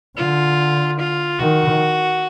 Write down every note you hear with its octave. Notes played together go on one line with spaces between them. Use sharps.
D3 F4
F4
D#3 F#4